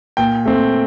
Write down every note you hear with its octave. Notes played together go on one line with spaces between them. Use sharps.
A#2 G5
A3 C4